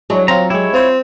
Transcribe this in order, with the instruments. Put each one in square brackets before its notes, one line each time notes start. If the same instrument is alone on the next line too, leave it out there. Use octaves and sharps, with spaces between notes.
[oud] F#3 [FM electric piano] G#3 D4 E4
[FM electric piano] C4 F4 [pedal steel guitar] A#5
[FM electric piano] G#3 G4 [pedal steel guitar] E4 C#5
[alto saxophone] C4 [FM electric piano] F4 C5